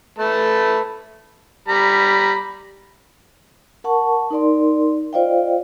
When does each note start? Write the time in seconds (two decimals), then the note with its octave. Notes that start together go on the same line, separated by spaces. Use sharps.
0.19 A3 B4 A5
1.68 G3 A#5 B5
3.84 A#4 F#5 A5 C#6
4.30 D#4 A#4 D5 C6
5.13 F4 C5 D5 D#5 F5 G5